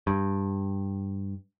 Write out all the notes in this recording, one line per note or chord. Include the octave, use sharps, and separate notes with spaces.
G2